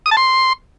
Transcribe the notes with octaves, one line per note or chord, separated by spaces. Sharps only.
D#6
A5
C6